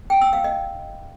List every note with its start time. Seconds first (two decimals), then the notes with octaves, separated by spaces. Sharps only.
0.10 G5
0.21 E6
0.33 F5
0.44 D#5